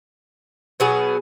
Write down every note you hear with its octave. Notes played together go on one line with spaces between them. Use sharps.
B2 F#3 B3 G#4